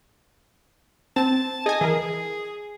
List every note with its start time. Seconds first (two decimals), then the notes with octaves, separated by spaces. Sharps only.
1.16 C4 A5
1.66 G#4 D#5 G#5
1.81 E3 G#4 A#4